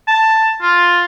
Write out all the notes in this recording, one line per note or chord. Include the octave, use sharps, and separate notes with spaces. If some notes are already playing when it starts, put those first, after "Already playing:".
A5
F4